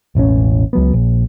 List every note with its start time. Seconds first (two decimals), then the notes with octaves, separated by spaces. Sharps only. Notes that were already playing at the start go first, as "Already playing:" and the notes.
0.15 E1 A1 C4 C#4
0.73 C#2 F#3 B3
0.94 A#1